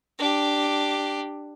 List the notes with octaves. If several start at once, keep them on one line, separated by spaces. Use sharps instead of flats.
D4 G4